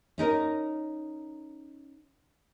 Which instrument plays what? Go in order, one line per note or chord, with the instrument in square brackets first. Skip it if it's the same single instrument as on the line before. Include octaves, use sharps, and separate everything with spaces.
[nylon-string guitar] C#4 D#4 A#4